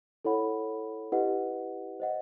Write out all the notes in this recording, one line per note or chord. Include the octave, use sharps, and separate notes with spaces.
E4 A4 C#5 F#5 B5
E4 G4 B4 D#5 F#5
C5 D#5 F#5